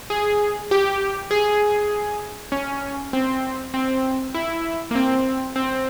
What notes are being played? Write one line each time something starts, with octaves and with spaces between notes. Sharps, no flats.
G#4
G4
G#4
C#4
C4
C4
E4
A#3
C4
C4